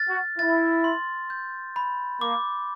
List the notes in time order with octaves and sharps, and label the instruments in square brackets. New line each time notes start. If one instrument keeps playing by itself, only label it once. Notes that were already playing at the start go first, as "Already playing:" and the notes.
Already playing: [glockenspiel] F6 A6
[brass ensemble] F#4
[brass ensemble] E4 [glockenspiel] A6
[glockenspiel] C6
G6
B5
[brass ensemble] A#3 [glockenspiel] D6